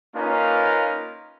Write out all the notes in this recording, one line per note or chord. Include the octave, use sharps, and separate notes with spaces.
A#3 C#4 D#4 F4 A#4 B4